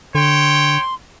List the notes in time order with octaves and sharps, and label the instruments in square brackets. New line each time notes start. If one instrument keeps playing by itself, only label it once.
[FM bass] D3 [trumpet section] C#5 G5 [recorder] C6